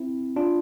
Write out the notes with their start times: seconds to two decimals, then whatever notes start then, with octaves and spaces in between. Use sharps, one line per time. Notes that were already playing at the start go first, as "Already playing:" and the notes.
Already playing: C4 E4
0.36 D4 F4